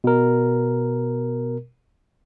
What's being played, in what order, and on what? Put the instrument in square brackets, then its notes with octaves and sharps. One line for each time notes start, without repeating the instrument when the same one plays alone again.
[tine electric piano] B2 A#4